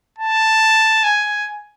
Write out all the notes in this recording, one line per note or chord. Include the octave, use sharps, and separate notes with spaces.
A5
G#5